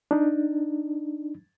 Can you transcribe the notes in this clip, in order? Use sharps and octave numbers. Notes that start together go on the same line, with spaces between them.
D4 D#4